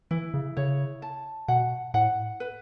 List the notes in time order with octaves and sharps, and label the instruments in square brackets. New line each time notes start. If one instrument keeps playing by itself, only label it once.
[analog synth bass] E3 [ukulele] E4
[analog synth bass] C#3
[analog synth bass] C#3 [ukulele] C#5
[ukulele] A5
[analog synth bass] B2 [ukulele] F#5
[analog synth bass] A2 [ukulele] F#5
[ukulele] B4